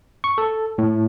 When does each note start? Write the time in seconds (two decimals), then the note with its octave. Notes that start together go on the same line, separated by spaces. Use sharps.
0.24 C#6
0.38 A4
0.78 A2